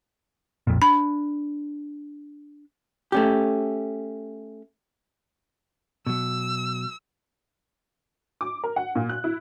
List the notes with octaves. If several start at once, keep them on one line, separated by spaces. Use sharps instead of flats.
B1 F2 A#2
D4 B5
A3 C#4 G4
B2 F#3 E6
D6
A#4
F#5
A#2
F#6
E4